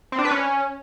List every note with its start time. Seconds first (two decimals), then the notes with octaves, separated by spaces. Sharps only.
0.12 C4
0.19 D4
0.25 B4
0.31 C#4